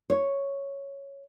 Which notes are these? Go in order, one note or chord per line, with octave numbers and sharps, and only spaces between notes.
C#5